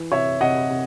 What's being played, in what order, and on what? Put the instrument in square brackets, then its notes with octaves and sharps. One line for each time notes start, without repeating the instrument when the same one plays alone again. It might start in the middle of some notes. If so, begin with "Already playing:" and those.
Already playing: [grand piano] E3
C3 C#5 E5
C3 D#5 F#5
C3